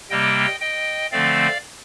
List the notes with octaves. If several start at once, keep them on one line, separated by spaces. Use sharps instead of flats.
C3 G3 A#3 D#5 G5
D#5 G5
D3 F3 A3 C4 D5 F5